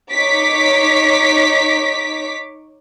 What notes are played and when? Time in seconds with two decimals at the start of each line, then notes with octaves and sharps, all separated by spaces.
0.11 D#4 C#5 D6 B6